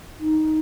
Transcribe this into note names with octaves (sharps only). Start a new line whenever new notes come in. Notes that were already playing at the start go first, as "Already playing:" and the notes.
D#4